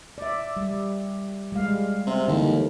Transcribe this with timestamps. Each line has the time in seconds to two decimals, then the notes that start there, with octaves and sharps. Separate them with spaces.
0.18 D5 E5
0.57 G3
1.52 G3 G#3 F5
2.07 C3
2.28 D#2 D3 E3